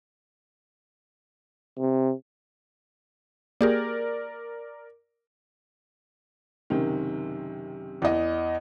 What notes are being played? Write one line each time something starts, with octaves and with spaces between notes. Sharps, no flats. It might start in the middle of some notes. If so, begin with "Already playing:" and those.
C3
A#3 G4 G#4 A#4 D5
F#1 C3 D#3
E2 D#5